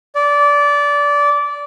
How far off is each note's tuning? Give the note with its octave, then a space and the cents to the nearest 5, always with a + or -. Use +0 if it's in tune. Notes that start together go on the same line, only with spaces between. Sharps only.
D5 -20